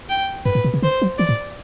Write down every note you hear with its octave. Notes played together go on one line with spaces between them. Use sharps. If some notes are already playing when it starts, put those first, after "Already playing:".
G5
G2 B4
A2
B2
C3
D3 C5
F#3
E3 D5
A2